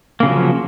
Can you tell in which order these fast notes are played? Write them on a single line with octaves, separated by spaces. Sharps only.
A#3 C#3 F#3 F3